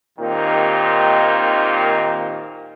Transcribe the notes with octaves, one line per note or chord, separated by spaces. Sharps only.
D#2 A#2 D#3 C4 D#4 G4